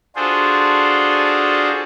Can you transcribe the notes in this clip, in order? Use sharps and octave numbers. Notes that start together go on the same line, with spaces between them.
D4 F4 F#4 G#4 A4 C5